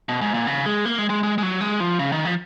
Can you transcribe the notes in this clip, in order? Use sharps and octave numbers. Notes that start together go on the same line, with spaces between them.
B2
G#2
A#2
C#3
G#3
A#3
G#3
G#3
G#3
G#3
F#3
G#3
F3
C#3
D#3
F3